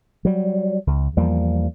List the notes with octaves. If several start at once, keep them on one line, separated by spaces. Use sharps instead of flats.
F#3 G3
C#2
E2 F3 G3 A#3